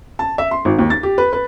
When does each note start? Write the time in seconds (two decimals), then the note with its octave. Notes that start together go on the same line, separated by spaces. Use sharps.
0.19 A5
0.38 E5
0.51 C6
0.65 G#1
0.79 D#2
0.90 A6
1.03 G4
1.18 B4
1.33 B4